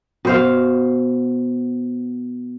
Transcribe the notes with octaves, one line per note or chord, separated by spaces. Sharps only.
B2 C5 F5